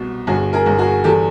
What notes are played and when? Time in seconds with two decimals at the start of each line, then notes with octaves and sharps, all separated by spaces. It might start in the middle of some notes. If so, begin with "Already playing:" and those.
Already playing: C2 B2
0.27 G1 F#4 G#4
0.53 G#4 A#4
0.66 G1
0.78 F#4 G#4
1.04 E2 G4 A4